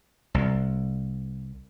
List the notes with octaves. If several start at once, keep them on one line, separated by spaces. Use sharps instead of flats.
C2